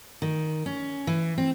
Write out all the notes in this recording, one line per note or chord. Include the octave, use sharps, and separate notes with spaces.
D#3
C#4
E3
C4